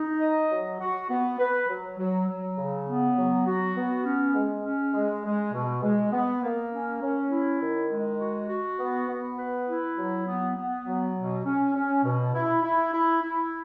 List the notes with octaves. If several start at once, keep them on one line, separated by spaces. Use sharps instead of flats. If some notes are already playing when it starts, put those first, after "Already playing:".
Already playing: D#4
D#5
F#3
F#4
B3
B4
F#3
F#3
F#3
C#3
B3
F#3
F#4
B3
C#4
G#3
C#4
G#3
G#3
B2
G#3
B3
A#3
C#4
C#4
E4
D#3
G#3
F#4
F#4
B3
B3
B4
E4
F#3
B3
B3
F#3
B2
C#4
C#4
B2
E4
E4
E4
E4